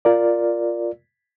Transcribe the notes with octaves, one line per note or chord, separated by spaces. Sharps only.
F4 A#4 D5